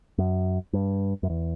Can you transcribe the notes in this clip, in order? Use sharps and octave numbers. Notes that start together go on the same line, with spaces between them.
F#2
G2
F#2
E2